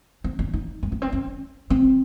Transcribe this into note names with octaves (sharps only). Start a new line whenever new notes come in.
C4
C#4
D#4
G#3
A#3
C4
C#4
C4